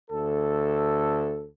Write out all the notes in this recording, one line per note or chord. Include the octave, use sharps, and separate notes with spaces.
D2 A4